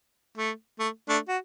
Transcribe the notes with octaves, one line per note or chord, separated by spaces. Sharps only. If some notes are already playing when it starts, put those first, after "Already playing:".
A3
A3
A3 D4
F#4